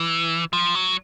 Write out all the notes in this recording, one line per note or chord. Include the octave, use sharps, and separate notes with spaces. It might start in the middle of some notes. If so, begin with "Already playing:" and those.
Already playing: E3
F3
F#3